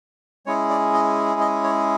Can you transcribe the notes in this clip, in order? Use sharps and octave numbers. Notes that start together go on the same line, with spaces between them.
G#3 C#4 E4 G#4 C#5
D5
D#5
D#5
C#5